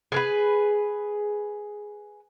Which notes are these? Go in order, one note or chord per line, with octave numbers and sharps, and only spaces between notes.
G#4 A#4 B4